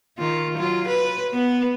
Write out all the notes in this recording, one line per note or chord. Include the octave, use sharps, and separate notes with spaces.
D#3 F4
F#3 F4
B4
B3